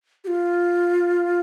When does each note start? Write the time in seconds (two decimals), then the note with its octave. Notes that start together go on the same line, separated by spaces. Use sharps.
0.24 G4
0.27 F4